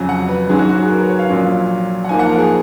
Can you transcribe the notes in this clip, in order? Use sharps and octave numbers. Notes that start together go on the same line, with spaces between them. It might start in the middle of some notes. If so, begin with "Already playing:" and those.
Already playing: F2 C#3 F#3 G#5
F#5
B4
G#2 F#3 C#4 G#4
F#4
F#4
G#4
A#4
B4
C#5
F5
A#1 A#2 F#3 C#4
F#5
G#2 F3 A#3 G#5
F#5
A#4
G#4